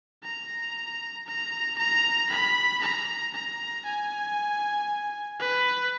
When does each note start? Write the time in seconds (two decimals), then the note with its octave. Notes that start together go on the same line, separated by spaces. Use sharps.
0.24 A#5
1.27 A#5
1.78 A#5
2.30 B5
2.82 A#5
3.34 A#5
3.85 G#5
5.40 B4